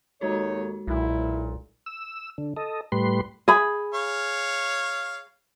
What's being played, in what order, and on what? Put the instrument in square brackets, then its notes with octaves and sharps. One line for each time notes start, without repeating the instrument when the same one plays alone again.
[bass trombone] D#2 [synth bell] G#3 F#4 A4 [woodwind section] D#4 C#5
[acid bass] B1 [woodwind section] A#2 [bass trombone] E4
[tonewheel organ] E6
D3
A4 D#5
A2 G3 B4 C6
[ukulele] G#4 B5
[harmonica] C#5 F5